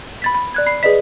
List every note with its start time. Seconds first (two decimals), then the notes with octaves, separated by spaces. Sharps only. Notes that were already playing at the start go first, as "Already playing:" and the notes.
0.22 B5 A6 B6
0.35 B5
0.54 D5 F#6 G#6
0.66 B5 C7
0.83 G#4 B4 D5 D#5 B6